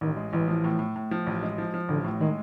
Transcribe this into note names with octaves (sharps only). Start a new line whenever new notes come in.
A1 D#3
G#3
A1 E3
F3
A2
A2
A2
F3
A1
G#3
F3
F3
A1 D3
A2
D#3 G#3